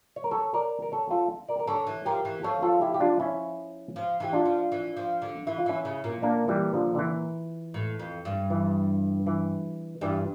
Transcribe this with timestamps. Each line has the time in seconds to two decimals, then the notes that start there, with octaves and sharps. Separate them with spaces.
0.16 C#5
0.24 A#4
0.31 A4 C#5
0.54 A#4 D5
0.82 A#4
0.92 A4 C#5
1.11 F4 A4
1.49 A#4 D5
1.59 A#4
1.67 D3 A4 C#5
1.87 E3
2.05 F3 G4 A#4
2.25 E3
2.43 F3 A4 C#5
2.62 F4 A4
2.81 E4 G4
2.94 G4
3.00 D4 F4
3.20 C#4 E4
3.96 F3
4.20 E3 G4
4.33 D4 F4
4.45 F3
4.72 E3
4.97 F3
5.22 D3
5.47 E3 E4
5.58 F4
5.66 E3 C#4 E4
5.85 C#3
6.04 A#2
6.22 A#3 D4
6.48 E3 G3
6.74 D3 F3
6.95 D3
6.99 E3
7.74 A2
7.99 F2
8.25 G2
8.50 E3
9.27 E3
10.01 G2 E3 G3